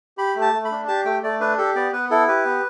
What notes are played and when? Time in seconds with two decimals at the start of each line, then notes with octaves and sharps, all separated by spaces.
0.18 G4 B5
0.35 A3
0.41 A5
0.54 A3
0.65 B5
0.71 D4
0.88 G4 A5
1.05 A3 G5
1.23 A3 D5
1.40 D4 B4
1.58 G4 A4
1.75 B3 D5
1.93 B3 B4
2.11 E4 A4
2.28 G4 B4
2.45 B3